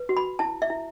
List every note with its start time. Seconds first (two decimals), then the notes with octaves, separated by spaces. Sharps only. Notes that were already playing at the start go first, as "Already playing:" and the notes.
Already playing: B4
0.09 F#4
0.17 B5
0.39 E4 A5
0.62 E5
0.70 E4